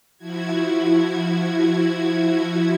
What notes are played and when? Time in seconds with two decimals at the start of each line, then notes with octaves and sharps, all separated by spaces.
0.17 F3 E4 F#4 G#6